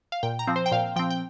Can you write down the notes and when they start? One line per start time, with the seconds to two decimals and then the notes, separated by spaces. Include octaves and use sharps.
0.12 F5
0.23 A#2 G5
0.39 A#5
0.47 F3 C4
0.56 C5
0.66 G5
0.72 A#2 F5
0.96 F3 C4 G5
1.10 G5